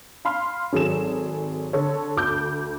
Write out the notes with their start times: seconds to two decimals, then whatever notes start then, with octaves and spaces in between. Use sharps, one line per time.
0.25 F5 B5 C6 F6
0.73 G#1 F#3 G#4 A4 E7
1.73 D3 A4 C#5
2.17 D2 D6 G6